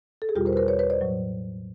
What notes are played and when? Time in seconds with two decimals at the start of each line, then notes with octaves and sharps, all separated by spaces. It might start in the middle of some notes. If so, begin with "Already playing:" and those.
0.22 A4
0.29 G#4
0.35 E2 B2 G3 F4 G4
0.46 A#4 C5
0.53 B4
0.57 A#4 C5
0.68 B4 C#5
0.79 B4 C#5
0.90 C5 D5
1.01 A2 F#3